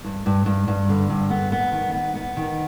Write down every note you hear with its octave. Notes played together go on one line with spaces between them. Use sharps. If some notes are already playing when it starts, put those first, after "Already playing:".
G2
G2
G2
G2
D3
G2
B3
B3
D#3
B3
B3
D#3